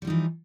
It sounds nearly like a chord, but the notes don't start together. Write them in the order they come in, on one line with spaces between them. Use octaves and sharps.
G3 F3 D#4 E3